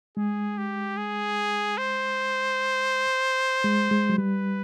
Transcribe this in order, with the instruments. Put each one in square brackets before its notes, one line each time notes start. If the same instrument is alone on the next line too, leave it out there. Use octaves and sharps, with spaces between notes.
[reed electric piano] G#3 [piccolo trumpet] G#4
[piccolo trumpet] G4
G#4
C5
[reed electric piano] G#3
G#3
F#3
[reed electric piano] G3 [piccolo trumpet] B4